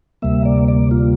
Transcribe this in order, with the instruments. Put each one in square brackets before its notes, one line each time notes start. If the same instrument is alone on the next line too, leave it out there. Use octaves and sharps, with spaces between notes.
[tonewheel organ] D2 C3 G3 A#3 E5
D5
D5
F4